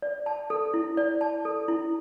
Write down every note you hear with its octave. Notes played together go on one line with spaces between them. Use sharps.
D5
A5
A4
E4
D5
A5
A4
E4